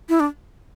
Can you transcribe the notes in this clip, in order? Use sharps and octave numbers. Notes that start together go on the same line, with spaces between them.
E4
D4